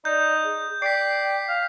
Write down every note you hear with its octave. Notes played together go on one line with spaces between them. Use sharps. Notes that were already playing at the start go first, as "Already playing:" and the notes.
D#4 D5 G6
G#4
D5 G5 B6 C7
F5